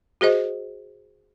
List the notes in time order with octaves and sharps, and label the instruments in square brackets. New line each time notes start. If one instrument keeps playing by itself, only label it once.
[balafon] F#4 G#4 C5 D#5